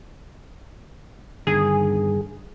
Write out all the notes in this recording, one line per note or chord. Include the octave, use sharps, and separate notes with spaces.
G2 D3 D#3 G#4